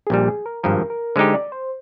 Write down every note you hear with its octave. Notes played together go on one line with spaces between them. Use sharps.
G#4
A#1 A#2 G3 G4
G#4
A#4
G#1 G2 F3 A#4
A#4
D3 G#3 D#4 G4 C5
D5
C5